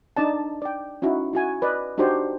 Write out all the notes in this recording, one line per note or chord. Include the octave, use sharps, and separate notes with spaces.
D4 D#4 D5 A5
D5 G5
C#4 D#4 E4 F#4
E4 F#4 G#5
B4 D5 D#5
D4 D#4 F#4 G4 C5 D5